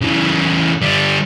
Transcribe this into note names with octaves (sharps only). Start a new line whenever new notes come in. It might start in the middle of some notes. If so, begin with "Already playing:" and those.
C#3 E3
D3 G3